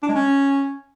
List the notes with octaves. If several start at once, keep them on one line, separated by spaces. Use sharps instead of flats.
D4
G#3
C#4